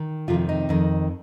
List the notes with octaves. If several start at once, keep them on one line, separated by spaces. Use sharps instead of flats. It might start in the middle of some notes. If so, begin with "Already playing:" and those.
Already playing: D#3
F2 C3 D#3 F4
D#4
F2 D#3